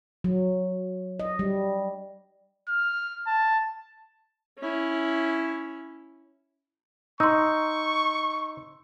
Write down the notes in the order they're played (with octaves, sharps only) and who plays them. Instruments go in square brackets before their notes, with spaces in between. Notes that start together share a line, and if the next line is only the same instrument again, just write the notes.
[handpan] F#3
D#5
G3
[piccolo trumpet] F6
A5
[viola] C#4 E4
[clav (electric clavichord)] D#4 [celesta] C6 E6 [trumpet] C#6